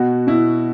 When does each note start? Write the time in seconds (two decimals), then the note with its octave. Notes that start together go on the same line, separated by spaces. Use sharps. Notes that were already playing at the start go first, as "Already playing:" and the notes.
Already playing: B2 F#4
0.27 B2 E4